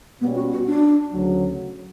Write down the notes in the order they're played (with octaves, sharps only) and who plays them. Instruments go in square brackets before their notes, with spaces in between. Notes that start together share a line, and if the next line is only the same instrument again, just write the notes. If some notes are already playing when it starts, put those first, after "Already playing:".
[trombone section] B2 G3 C#4 [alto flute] B3
[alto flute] F#4
F#4
D4
[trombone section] D2 C#3 F#3